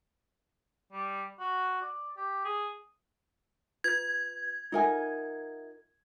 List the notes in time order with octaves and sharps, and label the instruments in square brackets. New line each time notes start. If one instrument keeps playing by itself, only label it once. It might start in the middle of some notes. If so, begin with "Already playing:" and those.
[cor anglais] G3
F#4
D5
G4
G#4
[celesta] F4 B4 [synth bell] G#6
[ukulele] D#4 A#4 G#5 [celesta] F4 E5 F#5